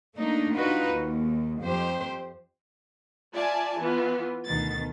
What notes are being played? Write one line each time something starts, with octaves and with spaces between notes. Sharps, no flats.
A3 A#3 D4 D#4
D4 D#4 F4 F#4 B4
D#2
F2 G4 C5
F4 D5 E5 G#5 A5
E3 B3 F4
D2 B2 D#3 A6